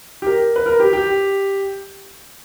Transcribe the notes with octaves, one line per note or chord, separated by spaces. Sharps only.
G4
A#4
B4
A#4
G4
G4